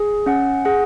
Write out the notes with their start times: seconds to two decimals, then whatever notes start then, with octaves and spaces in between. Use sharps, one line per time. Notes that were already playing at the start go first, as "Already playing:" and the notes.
Already playing: G#4
0.26 C#4 F#5
0.65 G#4 F#5